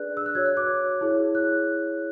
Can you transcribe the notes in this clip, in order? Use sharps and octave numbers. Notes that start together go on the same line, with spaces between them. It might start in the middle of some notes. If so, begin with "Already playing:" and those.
Already playing: D4 G#4 B4 D5 F#6
E6
F#6
F#4 C#5 G#6
F#6
D6
G#6
E4 G#4 C#5
F#6